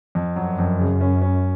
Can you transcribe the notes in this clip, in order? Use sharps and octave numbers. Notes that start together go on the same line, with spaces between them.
F2
F#2 F#3
F2
C#3
C#4
C#4